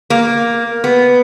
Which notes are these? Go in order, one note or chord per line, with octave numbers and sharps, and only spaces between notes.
A#3
B3